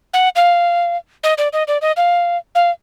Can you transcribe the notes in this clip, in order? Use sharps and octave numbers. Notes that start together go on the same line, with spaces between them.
F#5
F5
D#5
D5
D#5
D5
D#5
F5
F5